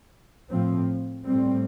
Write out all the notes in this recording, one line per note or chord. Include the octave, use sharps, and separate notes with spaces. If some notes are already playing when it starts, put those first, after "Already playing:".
A2 F3 C4
A2 G3 C4